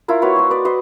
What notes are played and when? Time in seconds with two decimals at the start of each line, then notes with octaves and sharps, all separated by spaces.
0.08 E4 F4 A#4
0.22 A#3 F#4 B4 C#5
0.36 C5 D#5
0.50 B4 D5
0.65 B4 C5 D#5